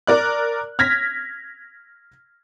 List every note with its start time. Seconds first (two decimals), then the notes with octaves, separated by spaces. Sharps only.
0.07 A#4 D5 F#6
0.79 F6 G#6 A#6 B6